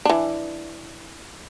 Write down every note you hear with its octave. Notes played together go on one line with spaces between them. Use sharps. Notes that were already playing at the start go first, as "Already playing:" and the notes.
E3 D4